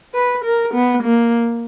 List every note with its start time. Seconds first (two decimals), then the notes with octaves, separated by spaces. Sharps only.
0.14 B4
0.44 A#4
0.74 B3
1.03 A#3